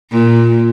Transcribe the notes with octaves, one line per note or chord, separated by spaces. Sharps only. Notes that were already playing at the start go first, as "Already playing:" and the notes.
A#2